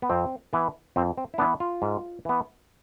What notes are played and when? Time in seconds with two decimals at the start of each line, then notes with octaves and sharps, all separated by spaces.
0.02 B3
0.10 F2 C4
0.53 E3 B3
0.96 F2 C4
1.18 C4
1.34 E4
1.38 E3 B3 D4
1.60 F4
1.82 G#2
2.25 E3 B3